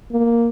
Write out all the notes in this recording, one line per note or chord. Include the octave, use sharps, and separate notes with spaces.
A#3